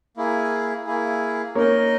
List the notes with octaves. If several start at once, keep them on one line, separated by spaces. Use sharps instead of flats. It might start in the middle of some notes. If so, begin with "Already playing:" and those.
A#3 E4 G#4
A#3 E4 G#4
A#3 C#4 D#4 A#4 D#5